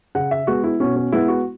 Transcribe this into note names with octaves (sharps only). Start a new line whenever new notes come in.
C#3 F#5
E5
G#3 B3 F#4
E4
B2 C#4
C#4
G#3 B3 E4
F#4